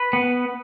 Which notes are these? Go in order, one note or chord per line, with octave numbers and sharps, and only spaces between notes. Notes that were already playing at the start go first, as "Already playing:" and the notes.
Already playing: B4
B3